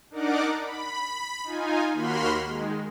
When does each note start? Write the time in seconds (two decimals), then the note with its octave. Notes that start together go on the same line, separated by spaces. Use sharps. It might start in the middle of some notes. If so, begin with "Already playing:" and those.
0.10 D4 D#4 A#4 D5 F#5 D6
0.61 B5
1.44 D#4 F4 G#5
1.93 D#2 A#3 F#4 B5 C6 F6
2.46 D#3 G#3